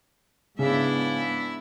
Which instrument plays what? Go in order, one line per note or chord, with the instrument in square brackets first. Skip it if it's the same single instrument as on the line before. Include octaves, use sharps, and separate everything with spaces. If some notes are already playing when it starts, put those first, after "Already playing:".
[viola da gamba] G#2 B3 D4 [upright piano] C#3 [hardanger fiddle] E4 E5